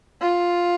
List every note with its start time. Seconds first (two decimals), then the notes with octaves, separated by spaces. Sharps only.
0.21 F4